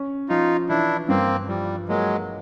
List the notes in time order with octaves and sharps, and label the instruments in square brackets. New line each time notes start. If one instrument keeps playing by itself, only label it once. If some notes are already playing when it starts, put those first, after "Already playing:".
Already playing: [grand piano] C#4
[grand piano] F3 [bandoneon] D#4 F4
[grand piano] E3 [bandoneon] D4 E4
[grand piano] G2 [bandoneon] A#3 C4
[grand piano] F3 [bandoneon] G3
[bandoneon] F#3 G#3 [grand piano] A#3